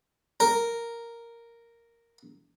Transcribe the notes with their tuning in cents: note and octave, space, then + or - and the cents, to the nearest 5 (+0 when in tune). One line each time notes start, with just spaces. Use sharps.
A#4 -5